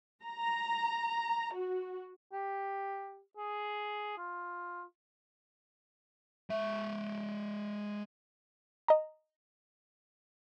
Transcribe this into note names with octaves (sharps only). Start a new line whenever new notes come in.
A#5
F#4
G4
G#4
F4
G#3 E5
D#5 A#5